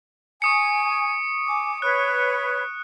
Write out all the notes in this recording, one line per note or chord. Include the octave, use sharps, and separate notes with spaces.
G#5 C#6 D#6 C#7
G#5 D6
B4 C#5 F#6